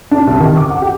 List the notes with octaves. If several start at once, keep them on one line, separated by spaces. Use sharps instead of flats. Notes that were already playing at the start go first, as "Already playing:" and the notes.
D4
C2
D#3
D6
F#5
G4